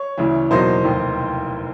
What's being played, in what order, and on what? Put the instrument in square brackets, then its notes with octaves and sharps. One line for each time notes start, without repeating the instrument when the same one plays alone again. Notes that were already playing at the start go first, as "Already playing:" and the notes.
Already playing: [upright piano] C#5
D2 C#3 E3
E2 B2 F#3 A#3 D#4 C5
F1 D#2 D#3